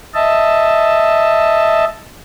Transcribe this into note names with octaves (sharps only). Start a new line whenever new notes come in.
D#5 E5 A5